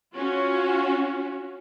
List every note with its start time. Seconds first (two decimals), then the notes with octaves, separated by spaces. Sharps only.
0.16 C#4 F4 F#4